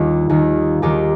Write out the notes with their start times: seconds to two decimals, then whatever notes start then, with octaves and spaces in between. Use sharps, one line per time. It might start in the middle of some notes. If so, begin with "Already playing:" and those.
Already playing: D#2 D#3 G3 F4 G4
0.29 D#2 D#3 G3
0.82 D#2 D#3 G3 D#4 G4